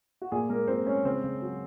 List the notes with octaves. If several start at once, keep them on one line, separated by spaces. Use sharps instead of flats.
F#4
A#2 G#4
G#3 A#3 A#4
A#2 C4 C5
G#3 C#4 C#5
C#3 C4 C5
C#3
F#3